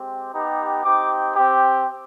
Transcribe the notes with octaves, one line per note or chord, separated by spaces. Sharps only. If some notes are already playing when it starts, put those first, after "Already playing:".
Already playing: G#3 C4 G4
B3 D#4 G4
C4 D#4 G4 D6
C4 G4